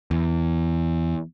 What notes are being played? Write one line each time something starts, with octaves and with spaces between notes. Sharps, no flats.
E2